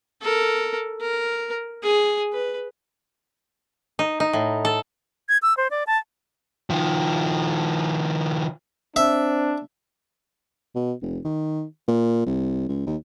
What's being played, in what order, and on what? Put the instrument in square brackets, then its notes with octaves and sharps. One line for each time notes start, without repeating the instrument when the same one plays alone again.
[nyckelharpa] A4 A#4
A#4
G#4
B4
[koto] D#4
D#4
A2
A4
[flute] G#6
E6
C5
D5
A5
[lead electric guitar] D#3 F3
[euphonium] C4 [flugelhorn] D4 [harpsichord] E5
[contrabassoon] B2
F1
D#3
A#2
C2
C#2
D#2